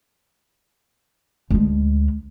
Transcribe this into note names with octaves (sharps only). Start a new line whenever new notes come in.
D2 G#3